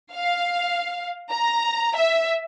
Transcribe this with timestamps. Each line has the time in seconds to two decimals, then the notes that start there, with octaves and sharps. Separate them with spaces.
0.13 F5
1.31 A#5
1.95 E5